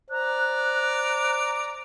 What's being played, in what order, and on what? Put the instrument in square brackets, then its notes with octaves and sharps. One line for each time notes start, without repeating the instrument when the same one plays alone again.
[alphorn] C5 [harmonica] D5 A#5 [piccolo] F#6